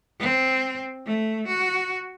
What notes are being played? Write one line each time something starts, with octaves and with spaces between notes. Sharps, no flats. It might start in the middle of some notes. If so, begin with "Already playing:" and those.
C4
A3
F#4